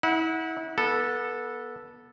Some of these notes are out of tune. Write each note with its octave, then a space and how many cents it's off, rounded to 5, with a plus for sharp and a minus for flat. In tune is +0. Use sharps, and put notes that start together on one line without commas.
E4 -35 F#5 -15
B3 -25 A4 +0